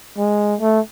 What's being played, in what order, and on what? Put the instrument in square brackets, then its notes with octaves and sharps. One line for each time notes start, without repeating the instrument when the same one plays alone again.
[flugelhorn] G#3
A3